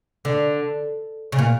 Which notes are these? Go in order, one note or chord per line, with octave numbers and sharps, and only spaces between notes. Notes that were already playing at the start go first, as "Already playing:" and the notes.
D3
C#3
A#2